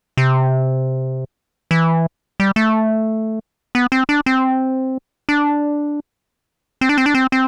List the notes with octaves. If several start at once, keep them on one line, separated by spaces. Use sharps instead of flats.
C3
E3
G3
A3
B3
C4
D4
C4
D4
C4
D4
C4
D4
C4
C4